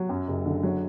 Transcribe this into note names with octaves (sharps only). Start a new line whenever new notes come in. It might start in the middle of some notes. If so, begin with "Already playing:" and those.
Already playing: F#3
F#2
F#1
D3
F#3